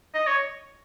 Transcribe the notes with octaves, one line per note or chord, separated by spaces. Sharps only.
D#5
C#5